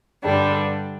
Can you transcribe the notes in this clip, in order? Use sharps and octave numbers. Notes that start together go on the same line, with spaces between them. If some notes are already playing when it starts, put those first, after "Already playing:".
G2 D3 G3 D4